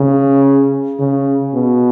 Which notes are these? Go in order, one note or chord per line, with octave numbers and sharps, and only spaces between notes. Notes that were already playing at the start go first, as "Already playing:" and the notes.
Already playing: C#3
C#3
B2